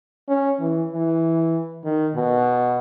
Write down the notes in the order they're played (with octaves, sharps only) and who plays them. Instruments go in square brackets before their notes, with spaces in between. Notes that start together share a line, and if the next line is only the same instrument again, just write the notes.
[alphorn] C#4
E3
E3
D#3
B2